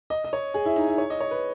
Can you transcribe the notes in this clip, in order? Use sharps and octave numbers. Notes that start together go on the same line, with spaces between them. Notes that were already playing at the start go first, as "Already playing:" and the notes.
D#5
D#5
C#5
G#4
E4
D#4
E4
C#5
D#5
C#5
B4